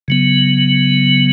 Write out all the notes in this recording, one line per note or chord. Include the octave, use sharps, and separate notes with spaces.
C#3 F#3 B3